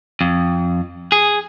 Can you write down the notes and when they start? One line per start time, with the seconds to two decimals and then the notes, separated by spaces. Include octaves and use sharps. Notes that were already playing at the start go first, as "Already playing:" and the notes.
0.21 F2
1.12 G#4